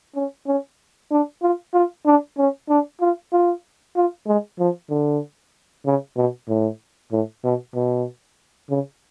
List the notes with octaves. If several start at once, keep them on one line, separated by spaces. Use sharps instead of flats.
C#4
C#4
D4
F4
F4
D4
C#4
D4
F4
F4
F4
G#3
F3
D3
C#3
B2
A2
A2
B2
B2
C#3